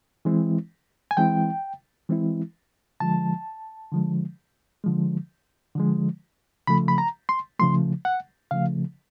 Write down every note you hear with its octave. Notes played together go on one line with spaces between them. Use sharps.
E3 G#3 C4 E4
G#5
E3 G#3 C4 E4 G5
E3 G#3 C4 E4
D3 F3 G#3 A5
D3 F3 G#3
D3 F3 G#3
D3 F3 G#3
C#3 F3 A3 B5
B5
A#5
C6
C#3 F3 A3 C6
F#5
C#3 F3 A3 F5